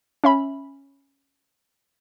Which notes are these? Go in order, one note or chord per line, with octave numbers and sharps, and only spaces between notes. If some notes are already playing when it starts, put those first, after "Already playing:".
C#4 E5 B5